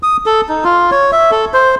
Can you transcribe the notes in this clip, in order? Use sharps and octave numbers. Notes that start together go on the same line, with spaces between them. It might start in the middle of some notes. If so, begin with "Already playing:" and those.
D#6
A4
D#4
F4
C#5
E5
A4
C5